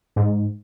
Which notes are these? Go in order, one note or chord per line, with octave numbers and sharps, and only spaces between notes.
G#2